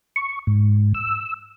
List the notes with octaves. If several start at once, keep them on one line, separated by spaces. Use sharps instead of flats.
C#6
G#2
E6